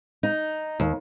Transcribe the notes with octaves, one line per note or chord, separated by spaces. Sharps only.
D#4
D#2